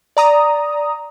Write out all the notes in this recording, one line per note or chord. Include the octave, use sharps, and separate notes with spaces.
D5 A#5 D#6